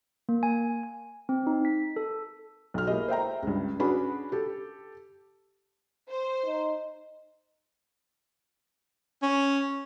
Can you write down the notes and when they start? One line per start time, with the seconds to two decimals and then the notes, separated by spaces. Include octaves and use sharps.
0.29 A#3
0.43 G#5
0.83 G#5
1.29 C4
1.47 D#4
1.65 B6
1.96 A4
2.74 B1 F6
2.87 A#3 E4 G4 G#4 D#5
3.08 C5 E5 G5 A#5
3.43 C#2 G2
3.80 C#4 D4 F#4 G#4 B4 B5
4.32 G4 A4
6.09 C5
6.46 D#4
9.22 C#4